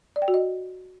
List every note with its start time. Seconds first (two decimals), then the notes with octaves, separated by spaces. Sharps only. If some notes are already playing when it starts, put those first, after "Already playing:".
0.16 D5
0.22 G5
0.28 F#4
0.34 D#5